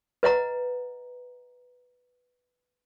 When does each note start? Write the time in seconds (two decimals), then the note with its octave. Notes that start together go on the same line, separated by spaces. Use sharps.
0.23 B4 D#5 F#5 A#5